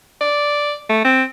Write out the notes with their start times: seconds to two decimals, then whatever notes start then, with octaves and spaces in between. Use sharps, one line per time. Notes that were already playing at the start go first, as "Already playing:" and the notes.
0.21 D5
0.89 A3
1.04 C4